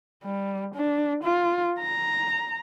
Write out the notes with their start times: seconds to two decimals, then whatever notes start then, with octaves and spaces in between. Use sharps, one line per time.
0.24 G3
0.75 D4
1.24 F4
1.79 A#5